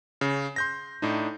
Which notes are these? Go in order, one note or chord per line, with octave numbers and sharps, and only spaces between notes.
C#3
C6 G6 A#6
A2 D4 D#4